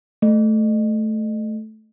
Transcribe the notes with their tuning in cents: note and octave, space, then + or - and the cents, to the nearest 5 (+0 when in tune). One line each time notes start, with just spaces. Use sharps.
A3 -10